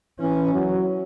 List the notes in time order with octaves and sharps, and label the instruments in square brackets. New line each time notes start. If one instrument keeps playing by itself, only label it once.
[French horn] E3 [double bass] C#4
[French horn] F#3